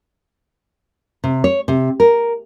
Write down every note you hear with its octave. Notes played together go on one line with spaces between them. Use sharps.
C3
C#5
C3
A#4